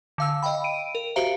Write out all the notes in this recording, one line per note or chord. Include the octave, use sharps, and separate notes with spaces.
D3 F5 E6
D#5 F5 G5 B5
D7 D#7
A#4
F#4 G4 C5 E5 F5 A#5